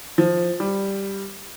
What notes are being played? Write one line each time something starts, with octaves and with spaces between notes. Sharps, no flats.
F3
G3